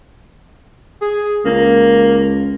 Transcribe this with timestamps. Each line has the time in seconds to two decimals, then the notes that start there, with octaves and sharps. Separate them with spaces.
1.01 G#4
1.45 C#2 A#3